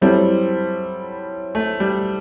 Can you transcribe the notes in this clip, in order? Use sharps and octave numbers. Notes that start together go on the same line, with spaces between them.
F#3 G3 C4 E4 A4
A3
G3